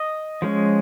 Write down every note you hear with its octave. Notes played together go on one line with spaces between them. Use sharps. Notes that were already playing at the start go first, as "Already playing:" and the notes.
Already playing: D#5
F3 G#3 C#4